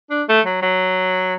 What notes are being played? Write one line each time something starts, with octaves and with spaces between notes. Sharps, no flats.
D4
A3
F#3
F#3